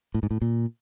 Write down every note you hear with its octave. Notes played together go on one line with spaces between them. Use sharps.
A2
G#2
A2
A#2